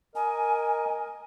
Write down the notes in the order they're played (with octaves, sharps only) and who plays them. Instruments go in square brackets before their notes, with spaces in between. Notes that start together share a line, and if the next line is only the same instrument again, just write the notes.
[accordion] A#4 D#5 [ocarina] G#5